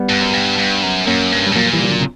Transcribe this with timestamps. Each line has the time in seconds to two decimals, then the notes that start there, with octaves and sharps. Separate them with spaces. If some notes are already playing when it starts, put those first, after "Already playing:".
Already playing: G3 B3
0.09 G2
0.21 F#2
0.33 G2
0.58 G2
0.83 F#2
1.07 F#2 A#3 C#4
1.32 G2
1.46 G3
1.52 G2
1.56 A#2 F#3 A#3
1.66 F#3
1.73 E3 G3
1.83 E3
1.88 D3 F#3
2.00 C#3